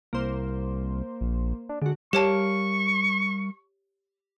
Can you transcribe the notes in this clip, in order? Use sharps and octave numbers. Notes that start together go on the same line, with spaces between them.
C2 A#3 C5
A#1
D4
D3 G#3 F#4
G3 G4 A#4 C#5 F5 A5 C#6